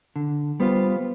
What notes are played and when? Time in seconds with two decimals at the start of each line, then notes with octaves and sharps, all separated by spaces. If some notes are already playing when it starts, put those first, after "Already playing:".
0.16 D3
0.60 G3 B3 F4 C5